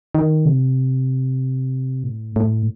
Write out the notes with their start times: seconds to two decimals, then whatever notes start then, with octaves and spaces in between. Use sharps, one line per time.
0.15 D#3
0.45 C3
2.03 A2
2.36 A2